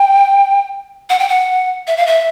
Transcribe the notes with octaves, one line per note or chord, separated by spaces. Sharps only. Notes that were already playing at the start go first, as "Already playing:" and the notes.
Already playing: G5
F#5
G5
F#5
E5
F5
E5